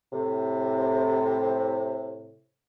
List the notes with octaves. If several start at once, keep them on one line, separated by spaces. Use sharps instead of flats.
A2 C3